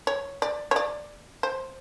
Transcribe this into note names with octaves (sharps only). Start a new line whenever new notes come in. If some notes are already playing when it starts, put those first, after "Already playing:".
C#5
D5
C#5
D5
C5